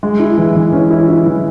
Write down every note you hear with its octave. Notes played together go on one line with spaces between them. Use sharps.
G#3
E4
E3
E3
C#4
E4
E4
E3